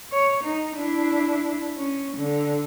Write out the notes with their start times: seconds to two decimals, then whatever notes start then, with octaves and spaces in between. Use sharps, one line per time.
0.12 C#5
0.44 D#4
0.76 D4 E4
1.77 C#4
2.17 D3